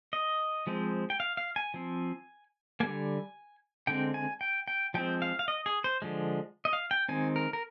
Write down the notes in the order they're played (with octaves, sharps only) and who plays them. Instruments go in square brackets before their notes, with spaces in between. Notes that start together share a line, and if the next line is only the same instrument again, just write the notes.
[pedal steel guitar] D#5
F3 G#3 C4
G5
F5
F5
G#5
F3 C4
D3 G3 A#3 G#5
D3 G#3 C4 G5
G#5
G5
G5
F3 G#3 C4 G5
F5
F5
D#5
G#4
C5
D3 F3 G#3
D#5
F5
G5
D#3 G#3 C4 G#5
A#4
A#4